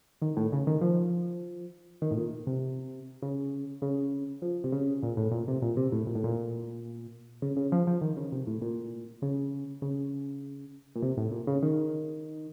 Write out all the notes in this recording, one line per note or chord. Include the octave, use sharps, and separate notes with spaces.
D#3
A2
C#3
D#3
F3
D#3
A2
A#2
C3
C#3
C#3
F3
C3
C#3
A#2
A2
A#2
C3
A#2
C3
A2
A#2
A2
A#2
C#3
C#3
F3
F3
D#3
C#3
C3
A2
A#2
C#3
C#3
A#2
C3
A2
A#2
C#3
D#3